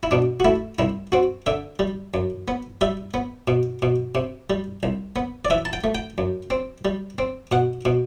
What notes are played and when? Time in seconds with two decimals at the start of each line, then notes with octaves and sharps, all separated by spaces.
0.03 E4
0.11 B2 D4
0.40 F#4
0.45 A3 E4
0.79 C2 E4
1.12 C4 F#4
1.46 D3 E5
1.79 G3
2.14 F#2
2.48 B3
2.81 G3 E5
3.14 B3
3.48 B2
3.82 B2
4.15 C3
4.50 G3
4.83 C2
5.16 B3
5.45 D5
5.50 E3 E5
5.65 A5
5.73 G5
5.84 A3
5.95 G5
6.18 F#2
6.50 C4
6.85 G3
7.18 C4
7.52 B2 F#5
7.85 B2